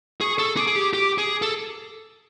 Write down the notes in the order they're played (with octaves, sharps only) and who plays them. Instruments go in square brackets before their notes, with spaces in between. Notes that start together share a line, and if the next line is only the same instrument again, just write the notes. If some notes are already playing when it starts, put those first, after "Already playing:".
[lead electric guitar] G#4 [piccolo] C#6
[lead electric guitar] A4
[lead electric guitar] G#4 [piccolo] D6
[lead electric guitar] G#4
G4
G4
G#4
A4